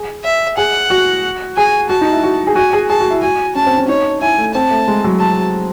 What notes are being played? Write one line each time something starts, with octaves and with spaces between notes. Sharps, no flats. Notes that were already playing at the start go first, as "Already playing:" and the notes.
Already playing: G#4
E5
G#4 F#5
F#4
G#4 G#5
F#4 A5
D#4
E4
F#4
G#4
F#4 G#5
G#4
G#4 A5
F#4
E4
F#4 G#5
C#4 A5
C4
C#4
D#4 C#5
E4 G#5
A3
C4 A5
A3
G#3
F#3
A5